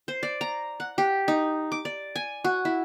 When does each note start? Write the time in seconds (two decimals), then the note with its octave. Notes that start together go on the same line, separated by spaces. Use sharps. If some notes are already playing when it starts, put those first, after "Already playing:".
0.08 C5
0.23 D5
0.41 A#5
0.80 F#5
0.98 G4
1.28 D#4
1.72 D6
1.85 D5
2.16 G#5
2.44 F#4
2.65 E4